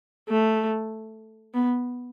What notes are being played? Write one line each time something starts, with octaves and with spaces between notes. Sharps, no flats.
A3
B3